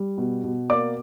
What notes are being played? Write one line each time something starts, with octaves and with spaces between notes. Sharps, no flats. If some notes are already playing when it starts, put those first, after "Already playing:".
Already playing: G3
B2
B2
A#3 D5 D6